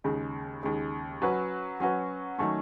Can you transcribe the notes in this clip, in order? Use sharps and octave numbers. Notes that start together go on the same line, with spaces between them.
D#2 C#3 G#3
D#2 C#3 G#3
F#3 C#4 F#4 B4
F#3 C#4 F#4 B4
D#3 F#3 A3 C#4